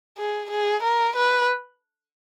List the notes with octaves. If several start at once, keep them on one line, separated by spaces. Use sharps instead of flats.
G#4
G#4
A#4
B4